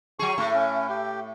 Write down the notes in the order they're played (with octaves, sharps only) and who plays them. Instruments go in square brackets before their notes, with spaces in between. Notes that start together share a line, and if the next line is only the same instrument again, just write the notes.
[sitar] F#3 G#4 [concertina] C#6
[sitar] A2 A3
[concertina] C#4
G4